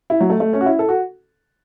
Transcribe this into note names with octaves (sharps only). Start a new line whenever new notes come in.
E4
F#3
A3
A3
C#4
F#4
E4
A4
F#4